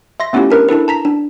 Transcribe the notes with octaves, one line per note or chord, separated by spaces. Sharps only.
E5 C6 A#6
A3 B3 C#4 E4 F4 G4
D4 A#4 B4
D4 E4 A4 B4
A5 A#5 B6
D4